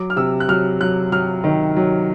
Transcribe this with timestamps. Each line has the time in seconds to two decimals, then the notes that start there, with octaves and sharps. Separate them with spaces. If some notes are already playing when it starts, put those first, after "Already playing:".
Already playing: F#3 D6
0.10 F6
0.16 C3 E6
0.40 F#6
0.48 F#3 F6
0.80 F#3 F#6
1.12 F#3 F6
1.44 D#3
1.76 F#3